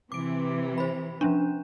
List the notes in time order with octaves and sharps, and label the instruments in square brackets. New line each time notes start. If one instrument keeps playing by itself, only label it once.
[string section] C3 E3 [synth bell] D6 D7
[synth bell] C5 B5
F3 C#4 D4